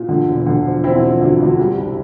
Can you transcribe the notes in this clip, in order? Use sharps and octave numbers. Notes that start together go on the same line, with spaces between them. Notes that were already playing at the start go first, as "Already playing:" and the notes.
Already playing: A#2
D3
E1
D3
F3
E1 C4 E4
F3
D2
D2
G3
C2